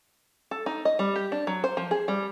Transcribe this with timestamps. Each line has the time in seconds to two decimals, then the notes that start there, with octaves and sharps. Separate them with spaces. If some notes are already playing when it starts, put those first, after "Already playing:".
0.51 A4
0.66 D#4
0.85 D#5
0.99 G3
1.16 G4
1.32 D4
1.47 F#3
1.64 C5
1.77 F3
1.91 G#4
2.08 G3